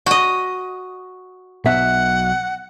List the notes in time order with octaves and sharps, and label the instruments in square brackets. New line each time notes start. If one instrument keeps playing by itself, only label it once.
[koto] F#4 D#5
[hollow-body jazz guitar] B1 B2 E5 [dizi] F#5